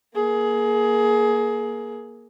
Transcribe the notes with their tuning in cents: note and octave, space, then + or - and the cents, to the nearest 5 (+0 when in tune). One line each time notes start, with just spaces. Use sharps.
A#3 +15 G#4 +20